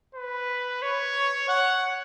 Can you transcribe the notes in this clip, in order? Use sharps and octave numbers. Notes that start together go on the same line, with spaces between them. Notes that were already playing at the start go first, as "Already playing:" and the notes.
B4
C#5
F#5